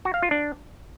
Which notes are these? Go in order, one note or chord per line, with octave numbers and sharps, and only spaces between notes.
F#4
F5
F4
D4